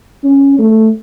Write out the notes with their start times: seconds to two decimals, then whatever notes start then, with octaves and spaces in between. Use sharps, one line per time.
0.24 C#4
0.59 A3